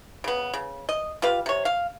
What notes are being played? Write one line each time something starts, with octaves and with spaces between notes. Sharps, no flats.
C#3 B3
C#3
D#5
F4 G4 B4 F5
C3 C#5
F5